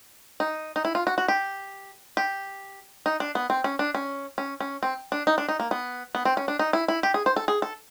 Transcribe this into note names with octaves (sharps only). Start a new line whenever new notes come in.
D#4
D#4
E4
F4
F#4
F#4
G4
G4
D#4
D4
B3
C4
C#4
D4
C#4
C#4
C#4
C4
D4
D#4
D4
D#4
A#3
B3
B3
C4
C#4
D4
D#4
E4
E4
G4
G#4
C5
A4
G#4
A4